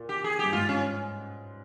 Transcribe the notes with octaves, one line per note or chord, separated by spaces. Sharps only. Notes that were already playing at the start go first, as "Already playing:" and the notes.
Already playing: A#2
G4
G#4
G2 G4
G#2 F4
C#4